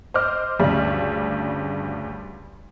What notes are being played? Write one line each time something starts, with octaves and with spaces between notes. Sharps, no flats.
C5 D#5 D6 F6
D2 G2 C#3 G3